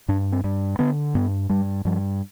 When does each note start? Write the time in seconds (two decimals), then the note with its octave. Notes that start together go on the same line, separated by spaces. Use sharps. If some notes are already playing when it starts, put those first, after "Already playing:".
0.08 G2 D4
0.32 C4
0.44 G2
0.79 D3 B3
1.15 G2 B3
1.49 G2 G3
1.85 G2 F3